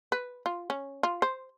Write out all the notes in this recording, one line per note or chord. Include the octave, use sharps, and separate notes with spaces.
B4
F4
C#4
F4
C5